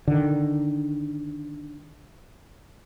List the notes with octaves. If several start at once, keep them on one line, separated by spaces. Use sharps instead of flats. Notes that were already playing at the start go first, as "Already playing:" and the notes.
D3 D#3